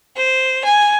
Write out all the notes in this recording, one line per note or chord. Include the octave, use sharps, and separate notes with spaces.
C5
G#5